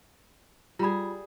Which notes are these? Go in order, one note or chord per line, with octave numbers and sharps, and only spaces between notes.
G3 F4 G#4 B5